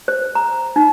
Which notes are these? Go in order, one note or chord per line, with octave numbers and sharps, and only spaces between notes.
C5
A#5
D#4